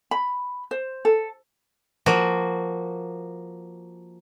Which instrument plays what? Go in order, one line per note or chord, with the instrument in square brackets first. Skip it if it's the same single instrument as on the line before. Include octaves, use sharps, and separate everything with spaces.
[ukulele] B5
C5
A4
[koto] F3 A#3 F#4